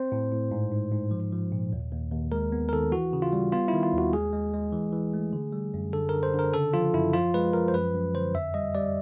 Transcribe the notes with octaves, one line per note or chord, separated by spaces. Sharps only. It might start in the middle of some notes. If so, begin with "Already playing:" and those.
Already playing: C4 C5
A2
A2
G#2
G#2
G#2
F3
F3
A#2
D#2
D#2
D#2
G#3 A#4
B3
A#4
D#3 A4
E3 F#4
C#3
F4
G3
B3 F4
E4
D#3
F4
D#2 F#4
G#3 G#4
G#3
G#3
E3
E3
A3
D3
G3
F#2
D3 A4
D3 A#4
C5
D3
A#4
C#3 A4
F3 F4
F#2 E4
F3 F4
G#3 B4
F3 A#4
C5
F#2 B4
F#2
D3 C5
F2 E5
G3 D#5
G3 D5